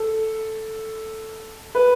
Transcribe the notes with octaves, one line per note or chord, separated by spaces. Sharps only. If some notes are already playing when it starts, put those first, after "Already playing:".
Already playing: A4
B4